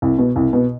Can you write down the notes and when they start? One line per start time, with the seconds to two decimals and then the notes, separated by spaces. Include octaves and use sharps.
0.02 C2
0.18 B2
0.36 C2
0.53 B2